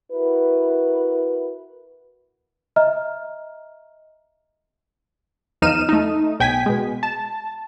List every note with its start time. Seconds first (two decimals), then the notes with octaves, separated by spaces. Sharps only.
0.11 E4 F#4 A#4 B4
2.76 D#5 E5 A#5 F6
5.62 E2 F3 D#4 F6 D#7 E7
5.89 A3 D#4
6.40 B1 G5 G#5 B6
6.66 B2 G#3
7.03 A5